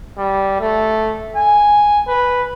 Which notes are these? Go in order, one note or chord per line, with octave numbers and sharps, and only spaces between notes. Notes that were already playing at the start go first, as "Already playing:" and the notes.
G3
A3
G#5
B4